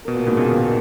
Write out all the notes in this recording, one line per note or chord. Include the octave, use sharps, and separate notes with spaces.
B2 A#4
A#2
G#2 B2 A#3
A#2 C#3
B2 D#3 A#4